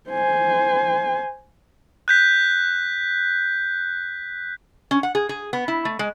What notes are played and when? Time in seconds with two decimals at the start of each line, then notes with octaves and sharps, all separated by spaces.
0.10 C5 G#5
2.08 F#6 G6 B6
4.91 C#4
5.03 F#5
5.15 G#4
5.29 G#4
5.53 B3
5.68 E4
5.85 A3
5.99 G#3